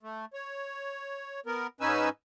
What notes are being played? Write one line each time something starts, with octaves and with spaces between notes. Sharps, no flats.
A3
C#5
B3 A#4
G#2 C#4 D#4 B4 G#5 E6